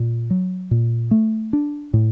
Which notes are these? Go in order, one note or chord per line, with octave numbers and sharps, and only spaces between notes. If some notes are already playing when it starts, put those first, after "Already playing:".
Already playing: A#2
F#3
A#2
A3
D4
A2